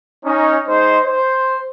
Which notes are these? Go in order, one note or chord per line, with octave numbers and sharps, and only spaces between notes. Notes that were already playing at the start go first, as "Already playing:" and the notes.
C#4 D#4
G#3 D#4 C5
C5